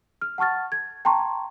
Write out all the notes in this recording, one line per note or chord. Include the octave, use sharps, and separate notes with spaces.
F6
F#5 A5 C#6 F6 A6
G#6
G5 A5 A#5 C6 C#6